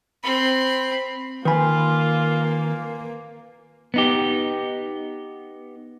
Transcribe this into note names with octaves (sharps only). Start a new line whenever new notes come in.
C4 B5
D#3 A#3 F4 B4 G#5 B5
B3 D#4 G4